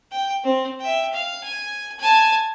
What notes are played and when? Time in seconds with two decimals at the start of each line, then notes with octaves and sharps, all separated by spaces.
0.12 G5
0.44 C4
0.80 E5 G5
1.13 F5
1.44 G#5
1.99 G#5 A5